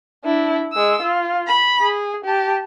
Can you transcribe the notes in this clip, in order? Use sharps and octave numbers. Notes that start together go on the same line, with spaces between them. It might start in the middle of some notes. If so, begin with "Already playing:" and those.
D4 E4
G#3 E6
F4
B5
G#4
G4 A5